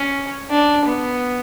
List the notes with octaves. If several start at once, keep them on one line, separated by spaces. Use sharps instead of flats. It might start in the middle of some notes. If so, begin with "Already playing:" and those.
Already playing: C#4
D4
B3